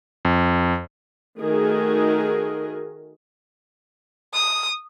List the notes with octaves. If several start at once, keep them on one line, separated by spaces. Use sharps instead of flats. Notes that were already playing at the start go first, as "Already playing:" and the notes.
F2
D#3 A3 F#4 G#4 A#4 D#5
D#6